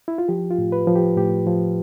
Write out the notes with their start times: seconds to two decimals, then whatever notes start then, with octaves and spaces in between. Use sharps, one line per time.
0.08 E4
0.18 F4
0.28 F3 G4
0.50 F4
0.58 A2
0.72 B4
0.87 F3
0.95 G4
1.17 A2 G4
1.47 F3